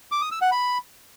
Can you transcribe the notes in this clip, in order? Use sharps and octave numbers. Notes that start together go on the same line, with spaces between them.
D6
D#6
E6
F#5
B5